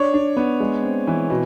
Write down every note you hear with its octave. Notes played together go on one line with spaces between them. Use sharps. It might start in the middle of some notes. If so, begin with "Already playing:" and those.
Already playing: D4 C#5
D4
B3
G#3
C4
E3
B2